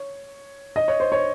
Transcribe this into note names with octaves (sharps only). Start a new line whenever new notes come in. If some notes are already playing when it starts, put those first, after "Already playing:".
Already playing: C#5
D#5
C#5
C5
C#5